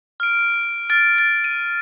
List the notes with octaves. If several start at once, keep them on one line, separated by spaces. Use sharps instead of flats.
F6 D7
F6 A6 D7
A6
D#7